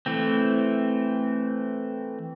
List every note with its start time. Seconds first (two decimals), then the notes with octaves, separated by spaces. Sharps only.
0.06 E3 A3 C4